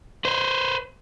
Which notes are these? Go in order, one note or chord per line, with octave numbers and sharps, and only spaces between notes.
B4 C5